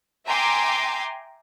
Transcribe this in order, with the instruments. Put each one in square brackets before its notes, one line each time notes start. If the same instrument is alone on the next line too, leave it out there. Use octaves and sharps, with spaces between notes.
[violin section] E5 G5 G#5 A#5 C6 D6